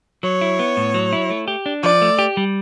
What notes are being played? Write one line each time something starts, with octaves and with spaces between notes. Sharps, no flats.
F#3 C#5
E4
B3
A2
F#3
E4
A3
G4
D4
F3 D5
A3
G4
G3